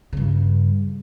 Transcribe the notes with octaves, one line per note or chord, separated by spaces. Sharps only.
G2 C#3